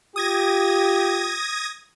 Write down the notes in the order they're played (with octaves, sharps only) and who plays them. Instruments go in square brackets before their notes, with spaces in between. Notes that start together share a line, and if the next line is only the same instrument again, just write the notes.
[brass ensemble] F4 G4 [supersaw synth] D#6 G#6 A#6